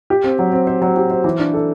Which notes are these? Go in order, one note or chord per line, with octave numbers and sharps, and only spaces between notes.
G4
C4
F#3
C4
C5
F#3
G4
C5
E3
D4
A4